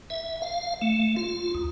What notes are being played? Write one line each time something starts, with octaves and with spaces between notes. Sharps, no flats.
E5
F5
A3
F4
D#2